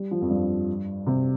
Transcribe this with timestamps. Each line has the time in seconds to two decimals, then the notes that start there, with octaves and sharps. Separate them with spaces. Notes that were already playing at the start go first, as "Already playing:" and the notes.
Already playing: G3
0.11 F3
0.21 F2
0.30 G2
1.07 C3